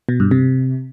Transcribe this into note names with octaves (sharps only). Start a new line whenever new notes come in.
B2
G2
C3